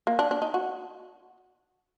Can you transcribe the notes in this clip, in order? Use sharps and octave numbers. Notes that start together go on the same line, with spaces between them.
A#3
D4
D4
D#4
F#4